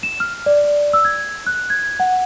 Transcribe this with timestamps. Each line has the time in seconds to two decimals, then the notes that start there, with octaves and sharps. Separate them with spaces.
0.03 E7
0.20 F6
0.46 D5
0.93 E6
1.05 G#6
1.47 F#6
1.70 G#6
2.00 F#5